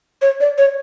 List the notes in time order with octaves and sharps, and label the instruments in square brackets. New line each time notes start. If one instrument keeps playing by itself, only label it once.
[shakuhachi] C#5
D5
C#5